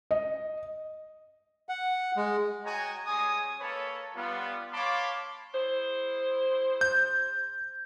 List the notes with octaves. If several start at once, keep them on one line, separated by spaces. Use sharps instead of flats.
D#5
F#5
G#3
F#4 C#5 D#5 G5 G#5 A#5
G3 G#3 C#4 G#5 D#6
A#3 A4 B4 C#5
G3 B3 F4
C#5 F5 A5 B5 C6 D6
E4 G#4 C5
G6